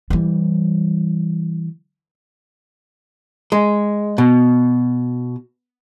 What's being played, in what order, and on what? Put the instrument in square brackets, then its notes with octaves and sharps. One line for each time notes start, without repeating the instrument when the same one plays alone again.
[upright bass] E3 G3
[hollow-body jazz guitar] G#3
B2